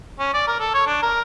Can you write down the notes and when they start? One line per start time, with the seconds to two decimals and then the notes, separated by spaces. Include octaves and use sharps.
0.19 C#4
0.34 D5
0.47 A#4
0.60 A4
0.74 C#5
0.87 D4
1.02 A#4